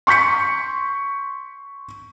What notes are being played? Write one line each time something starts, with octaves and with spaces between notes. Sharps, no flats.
C6 C#6 G6 B6 C#7